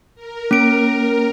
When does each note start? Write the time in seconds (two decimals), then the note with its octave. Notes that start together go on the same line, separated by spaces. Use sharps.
0.15 A#4
0.51 A#3 C#4 D7